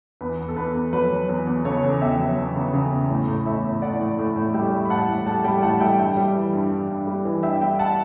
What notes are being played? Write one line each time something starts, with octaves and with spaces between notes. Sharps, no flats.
E2 B4
E2
A4
E2 B4
E2
F#3 B4
F#3
E2 B4
E2
C#3 A4 C#5
E2
E2 E5 G5
F#3
E2
C#3
C#3
E2
A2
A2
A2 C#5 E5
A2
A2 D5 F#5
A2
A2
A2
G3 E5 G5
G3
B5
A2 F#5 A5
A2
G3 F#5 A5
G3 G5 B5
A2 F#5 A5
G3 E5 G5
G2 E5 G5
G3
E3
G2
G2
G2
G3
E3
G2 E5 G5
G3 G5 B5
F#5 A5